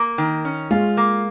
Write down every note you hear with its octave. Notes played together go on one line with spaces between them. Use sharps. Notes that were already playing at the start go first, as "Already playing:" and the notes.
Already playing: A#3
D#3
C#4
G#3 F4
A#3